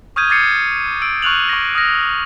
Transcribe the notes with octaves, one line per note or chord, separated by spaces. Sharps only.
C#6 D#6 F6 G6 G#6 D#7
D6 G#6 A6 C7 C#7
E6 D7
C#6 F6 F#6 F7 F#7
C#6 A#6
D#6 F6 A#6